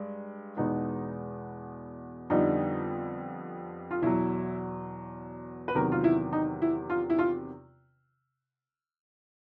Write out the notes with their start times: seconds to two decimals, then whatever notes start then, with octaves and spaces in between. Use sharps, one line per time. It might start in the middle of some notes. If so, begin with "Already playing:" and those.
Already playing: G2 G#3
0.57 E2 B2 G#3 B3 D#4
2.30 F2 D3 G3 B3 D#4
3.91 F4
4.02 E2 B2 F#3 E4
5.68 B4
5.75 E2 C3 D#3 F#3 B3 A#4
5.92 F4
6.04 E4
6.33 D#4
6.62 E4
6.90 F4
7.10 E4
7.19 F4